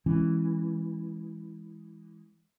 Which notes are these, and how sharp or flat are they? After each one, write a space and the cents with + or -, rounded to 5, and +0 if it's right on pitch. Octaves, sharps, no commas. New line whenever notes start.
E3 -5 G#3 -10 C#4 -35